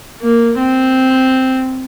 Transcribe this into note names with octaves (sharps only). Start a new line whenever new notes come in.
A#3
C4